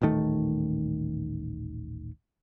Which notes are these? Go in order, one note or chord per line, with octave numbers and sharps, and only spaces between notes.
D#1 A1 D#3 A3